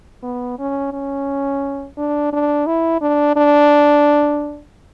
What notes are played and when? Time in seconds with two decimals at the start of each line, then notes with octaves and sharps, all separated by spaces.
0.23 B3
0.59 C#4
0.93 C#4
1.98 D4
2.32 D4
2.67 E4
3.02 D4
3.36 D4